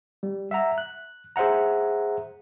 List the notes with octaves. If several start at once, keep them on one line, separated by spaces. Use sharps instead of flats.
G3
E5 F#5 A#5
F#6
G#4 C5 E5 F#5 A#5